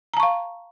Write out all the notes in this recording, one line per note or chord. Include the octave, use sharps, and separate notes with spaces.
F5 A5 A#5 C#6